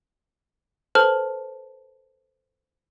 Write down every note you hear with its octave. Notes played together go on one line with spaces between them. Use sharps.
A4 B4 C5 A5 F6